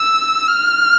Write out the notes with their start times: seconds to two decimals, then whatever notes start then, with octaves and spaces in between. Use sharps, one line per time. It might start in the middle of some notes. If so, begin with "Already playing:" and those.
Already playing: E6
0.48 F6